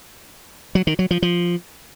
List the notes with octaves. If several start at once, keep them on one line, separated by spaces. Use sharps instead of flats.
F#3
D#3
F#3
F3
F3